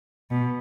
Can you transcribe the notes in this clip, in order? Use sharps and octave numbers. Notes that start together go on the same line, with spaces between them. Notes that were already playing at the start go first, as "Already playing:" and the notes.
B2